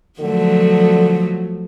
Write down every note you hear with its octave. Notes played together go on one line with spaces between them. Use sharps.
D3 F3 F#3 A3